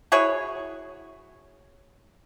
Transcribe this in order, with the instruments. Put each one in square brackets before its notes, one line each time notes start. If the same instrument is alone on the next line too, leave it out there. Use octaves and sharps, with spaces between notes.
[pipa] E4 F#4 G#4 C#5